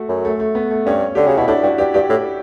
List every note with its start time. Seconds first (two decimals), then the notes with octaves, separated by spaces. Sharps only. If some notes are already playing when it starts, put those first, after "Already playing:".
Already playing: A3 F#4
0.09 F#2
0.25 A3
0.40 A3
0.55 B3
0.70 A3
0.86 G2 C#4
1.15 D3 G4
1.27 C#3 F#4
1.37 B2 E4
1.48 A2 D4
1.63 G2 F#4
1.78 G2 G4
1.94 G2 G4
2.09 A2